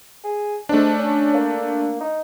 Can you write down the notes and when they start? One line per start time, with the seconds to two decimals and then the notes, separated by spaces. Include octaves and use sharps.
0.24 G#4
0.69 G#2 A3 D4
0.99 C#4
1.34 A#3
2.01 D#4